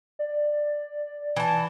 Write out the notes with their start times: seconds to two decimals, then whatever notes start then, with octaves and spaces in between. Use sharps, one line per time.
0.19 D5
1.36 E3 A5